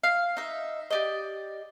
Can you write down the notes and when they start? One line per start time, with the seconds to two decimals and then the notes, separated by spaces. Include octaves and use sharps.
0.03 F5
0.37 D#4 E5
0.90 G4 D5 D#5